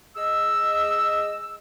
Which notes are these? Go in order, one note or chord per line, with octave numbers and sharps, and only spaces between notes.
G#3 G#4 D#5 E6